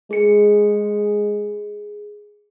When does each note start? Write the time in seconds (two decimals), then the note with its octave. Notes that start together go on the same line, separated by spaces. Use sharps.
0.11 G#3 G#4 C#7